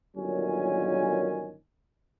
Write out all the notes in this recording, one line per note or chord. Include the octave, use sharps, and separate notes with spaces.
G1 A#2 D#3 F#3 C#4 G#5